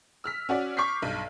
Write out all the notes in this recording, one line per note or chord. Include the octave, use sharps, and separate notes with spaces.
E6 F6 B6
C#4 F#4 D5
C#6 D6 F6 G6 B6 C7
B1 G2